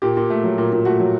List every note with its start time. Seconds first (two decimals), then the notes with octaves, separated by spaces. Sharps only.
0.02 A#2 G4
0.17 A#2
0.30 A3
0.44 F#3
0.58 A#2
0.73 A#2
0.85 A3 F#4
0.99 F#3